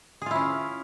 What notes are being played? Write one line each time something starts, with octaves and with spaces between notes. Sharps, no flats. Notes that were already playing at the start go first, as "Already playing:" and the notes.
C#4 E4 F4 G#4